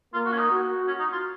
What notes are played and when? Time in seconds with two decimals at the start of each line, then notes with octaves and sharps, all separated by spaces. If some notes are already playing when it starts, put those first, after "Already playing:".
0.14 A#3 F4
0.25 F#4
0.32 C#4
0.38 D#4
0.51 F#4
0.88 C#4
1.00 D#4
1.12 F4